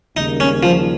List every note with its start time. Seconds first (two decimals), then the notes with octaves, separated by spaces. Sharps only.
0.17 D#2 C#3 G3 A#3 D#4
0.40 C#4
0.63 F3